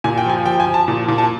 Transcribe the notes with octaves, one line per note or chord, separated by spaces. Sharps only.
A#2 G#5
G5
F3 G#5
F3 G5
G#5
F3
A5
A#2
A#2
A5